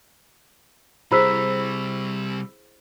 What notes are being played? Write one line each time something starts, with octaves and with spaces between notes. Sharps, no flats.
C3 G3 E4 G#4 C5 B5 E6 B6